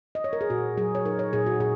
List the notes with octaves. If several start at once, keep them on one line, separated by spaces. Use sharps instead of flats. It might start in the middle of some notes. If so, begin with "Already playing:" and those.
D#5
C#5
A#4
G#4
A#2 F#4
F#3 G#4
C#5
D#4 A#4
C#5
A#2 G#4
F#4
A#2 G#4